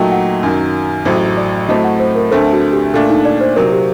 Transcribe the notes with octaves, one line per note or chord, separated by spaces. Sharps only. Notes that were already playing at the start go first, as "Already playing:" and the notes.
Already playing: A#2 F#3 A3 D#4 G5
F#5
F#2 D#3 F#3
A1 A2 F#3 C5
D5
A2 F#3 A3 C4 D#5
F#5
C5
A#4
D2 D3 A3 C4 A4
F#4
G4
A#2 A3 D4 A4
D#4
D5
C5
C3 F#3 C4 A#4
G4